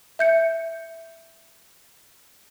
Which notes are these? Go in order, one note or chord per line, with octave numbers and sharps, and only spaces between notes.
E5 G6 C#7